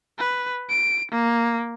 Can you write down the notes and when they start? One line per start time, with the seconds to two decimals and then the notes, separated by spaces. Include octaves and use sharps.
0.18 B4
0.69 D7
1.11 A#3